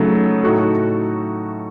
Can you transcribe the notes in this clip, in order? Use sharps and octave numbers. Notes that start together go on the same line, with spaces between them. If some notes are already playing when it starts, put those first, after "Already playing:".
Already playing: C#3 F#3 A3 D#4 A4
A2 A3 D#4 F#4 A4